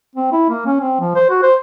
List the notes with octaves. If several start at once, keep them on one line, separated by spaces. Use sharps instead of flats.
C4
E4
A#3
C#4
C4
F3
C5
F#4
C5